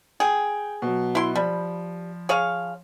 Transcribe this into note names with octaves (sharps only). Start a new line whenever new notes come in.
G#4 G5
B2 F#3
E4 C6
F3 G3 B5
G#4 C#5 F5